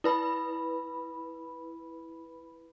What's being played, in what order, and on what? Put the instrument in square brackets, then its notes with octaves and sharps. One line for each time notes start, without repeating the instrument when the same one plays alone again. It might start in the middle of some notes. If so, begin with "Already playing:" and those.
[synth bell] E4 B4 B5